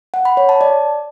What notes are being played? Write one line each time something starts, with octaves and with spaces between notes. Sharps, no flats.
F#5
B5
C#5
A5
D5